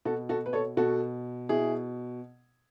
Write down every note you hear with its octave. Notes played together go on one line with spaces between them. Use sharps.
B2 F#4 A4
F#4 A4
B4
A4 C#5
B2 F#4 A4
B2 E4 G#4